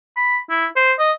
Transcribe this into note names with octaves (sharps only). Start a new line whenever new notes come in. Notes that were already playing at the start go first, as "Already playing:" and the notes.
B5
E4
C5
D#5